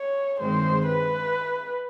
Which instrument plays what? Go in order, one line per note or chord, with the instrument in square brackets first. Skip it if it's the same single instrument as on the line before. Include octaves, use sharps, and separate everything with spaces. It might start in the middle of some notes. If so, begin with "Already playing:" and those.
Already playing: [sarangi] C#5
[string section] G2 D#3 G#3 C4 [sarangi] C5
[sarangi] B4